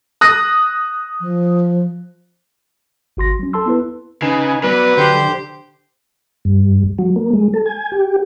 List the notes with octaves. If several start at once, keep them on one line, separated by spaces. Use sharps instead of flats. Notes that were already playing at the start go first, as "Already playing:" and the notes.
D#6 F#6 A#6
F3
G#1 F#4 C6 A#6
F#3 C#4
A4 A5 C6 E6
B3 E4 B4
C#3 D#4 B4 G#5
F#3 B3 B4 D5
D3 G4 C5 G6
G2
F#3
A#3
G#3
A4
G#5
G4